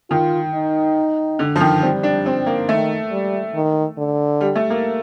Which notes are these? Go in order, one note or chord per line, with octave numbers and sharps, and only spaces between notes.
D#3 F4
D#4
D3
F3
D#3
G3 C4
D4
C4
A#3
D#3 A3
G3
D#3
D3
G3
A3
A#3